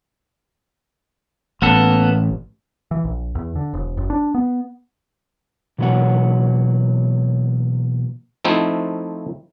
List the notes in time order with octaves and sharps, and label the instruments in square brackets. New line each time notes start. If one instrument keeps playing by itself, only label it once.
[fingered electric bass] A1 [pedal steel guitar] A#3 B3 A4
[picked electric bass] E3
A#1
E2
D3
E1
F#1
D4
B3
[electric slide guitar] B2 E3 F#3 A#3 C#5 F#5
[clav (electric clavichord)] F3 A3 C4 D#4 E4